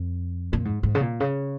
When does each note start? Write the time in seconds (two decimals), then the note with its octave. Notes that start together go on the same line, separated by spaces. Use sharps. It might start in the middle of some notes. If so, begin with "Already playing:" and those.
Already playing: F2
0.53 A#2
0.65 G#2
0.83 G#2
0.95 C#3
1.01 A#2
1.20 C#3